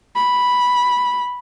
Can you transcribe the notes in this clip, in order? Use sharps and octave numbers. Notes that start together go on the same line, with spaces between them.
B5